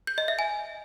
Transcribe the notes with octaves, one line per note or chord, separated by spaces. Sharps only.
G6
D#5
E5
G#5